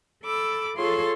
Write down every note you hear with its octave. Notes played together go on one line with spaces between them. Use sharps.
A4 B5 D6 E6
F4 G#4 A4 C#5 C6